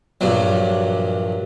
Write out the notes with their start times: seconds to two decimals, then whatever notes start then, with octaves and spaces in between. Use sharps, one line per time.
0.21 A#1 G2 F#3